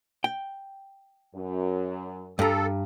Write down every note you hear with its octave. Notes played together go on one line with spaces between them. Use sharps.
G5
F#2
G2 A4 A#5